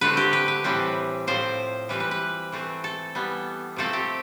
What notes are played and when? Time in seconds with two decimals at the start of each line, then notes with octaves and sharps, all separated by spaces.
0.01 D3 A3 C4 B4
0.17 G4
0.33 B4
0.48 B4
0.64 A2 E3 G3 C4
1.27 A2 F3 C4 C5
1.89 E3 G3 C4 B4
2.00 B4
2.11 B4
2.52 E3 A3 C4
2.84 A4
3.15 E3 G3 B3
3.76 C3 F3 A3 C4 A4
3.93 G4